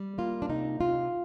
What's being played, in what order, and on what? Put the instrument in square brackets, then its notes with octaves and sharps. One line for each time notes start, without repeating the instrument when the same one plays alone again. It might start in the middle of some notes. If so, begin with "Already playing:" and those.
Already playing: [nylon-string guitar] G3
A#3 F4
D4
C3 D#4
C3 F4